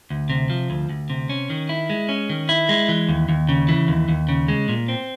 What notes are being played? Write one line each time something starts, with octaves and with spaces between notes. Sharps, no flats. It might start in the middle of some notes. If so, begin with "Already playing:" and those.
D2
C3
F3
D2
D2
C3
C#4
D#3
E4
G#3
C#4
D#3
E4
G#3
E3
D#2
D#2
C#3
E3
D#2
D#2
C#3
G#3
A#2
C4